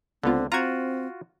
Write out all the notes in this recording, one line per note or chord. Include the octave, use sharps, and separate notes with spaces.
C#2 D3 B3 C4 F4
C4 F4 F#4 A#5 G#6